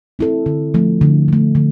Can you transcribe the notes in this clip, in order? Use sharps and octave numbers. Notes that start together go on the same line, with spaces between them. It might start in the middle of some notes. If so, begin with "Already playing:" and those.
C4 E4 A4
D3
F3 A3
D3
F3 A3
D3